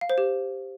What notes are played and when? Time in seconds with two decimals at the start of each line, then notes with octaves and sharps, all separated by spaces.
0.01 F5
0.10 C5
0.18 G4